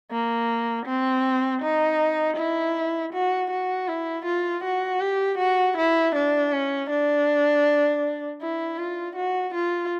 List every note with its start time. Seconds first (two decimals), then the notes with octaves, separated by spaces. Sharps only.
0.11 A#3
0.86 C4
1.62 D#4
2.37 E4
3.13 F#4
3.51 F#4
3.88 E4
4.26 F4
4.64 F#4
5.01 G4
5.38 F#4
5.77 E4
6.15 D4
6.52 C#4
6.90 D4
8.41 E4
8.78 F4
9.16 F#4
9.54 F4